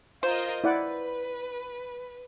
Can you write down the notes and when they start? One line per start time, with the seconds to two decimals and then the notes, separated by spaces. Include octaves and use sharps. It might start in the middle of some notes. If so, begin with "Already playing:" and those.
0.23 F4 A#4 C5 D#5
0.64 E4 B4 D5 F#5